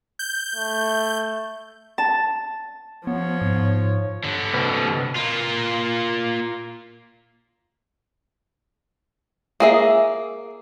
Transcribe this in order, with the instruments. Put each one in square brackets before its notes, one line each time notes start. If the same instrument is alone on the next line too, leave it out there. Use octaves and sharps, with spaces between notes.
[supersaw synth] G6
[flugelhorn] A3
[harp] A5
[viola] F3 C#5 [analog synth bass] B3
[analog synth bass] G#2
[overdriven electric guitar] D3 B3
[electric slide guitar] C3 B4
[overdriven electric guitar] A#3 F4
[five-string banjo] A#3 G#4 E5